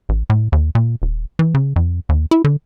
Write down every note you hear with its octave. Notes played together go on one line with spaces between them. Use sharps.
A1
A2
D#2
A#2
D#1
E3
C#3
F2
D#2
E4
D3